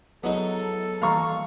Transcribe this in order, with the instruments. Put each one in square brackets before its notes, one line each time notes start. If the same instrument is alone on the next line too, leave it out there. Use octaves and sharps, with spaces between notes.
[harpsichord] F#3 G#3 D#4 [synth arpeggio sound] B3 E4 [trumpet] A4
[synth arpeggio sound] E3 G3 A#3 [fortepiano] F5 A#5 C#6